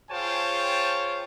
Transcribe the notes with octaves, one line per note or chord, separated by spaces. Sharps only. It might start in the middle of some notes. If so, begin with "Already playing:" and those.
F4 G#4 C5 C#5 G5 A5